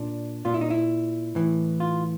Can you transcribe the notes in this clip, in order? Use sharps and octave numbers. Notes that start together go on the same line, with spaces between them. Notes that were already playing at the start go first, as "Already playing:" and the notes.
Already playing: A#2 D4
A#2 F4
E4
D#4
E4
A2 E3
F4